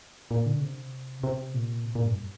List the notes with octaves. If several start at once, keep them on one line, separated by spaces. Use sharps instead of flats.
A#2
D3
C3
C3
A#2
C3
A#2
G2